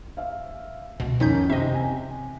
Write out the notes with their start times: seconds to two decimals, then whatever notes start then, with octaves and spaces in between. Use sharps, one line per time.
0.17 E5 F5
1.00 C#2 B2
1.20 F2 D#3 C#4 D#4 G6 B6
1.50 C3 D#5 E5
1.74 G#5